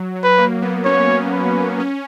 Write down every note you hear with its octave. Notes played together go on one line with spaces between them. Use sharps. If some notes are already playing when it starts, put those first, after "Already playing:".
Already playing: F#3
F#3
B4
A#3
B3
C#4 C#5
B4
C#4